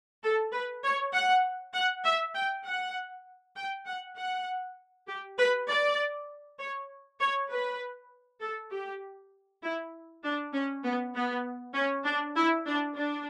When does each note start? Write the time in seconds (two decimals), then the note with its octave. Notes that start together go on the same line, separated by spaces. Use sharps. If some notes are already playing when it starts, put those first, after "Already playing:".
0.23 A4
0.52 B4
0.83 C#5
1.13 F#5
1.74 F#5
2.04 E5
2.35 G5
2.65 F#5
3.56 G5
3.85 F#5
4.17 F#5
5.08 G4
5.38 B4
5.68 D5
6.59 C#5
7.19 C#5
7.50 B4
8.41 A4
8.71 G4
9.62 E4
10.23 D4
10.53 C#4
10.84 B3
11.15 B3
11.74 C#4
12.04 D4
12.36 E4
12.66 D4
12.96 D4